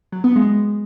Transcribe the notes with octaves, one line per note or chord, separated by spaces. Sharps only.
F#3
B3
G#3